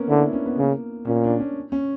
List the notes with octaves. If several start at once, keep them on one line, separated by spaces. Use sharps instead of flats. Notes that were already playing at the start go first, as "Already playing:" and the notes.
Already playing: A#3 B3 C#4
D3 E4
D4
C#4
B3
C#3 A#3
A#2 C#4
D4
C#4
C#4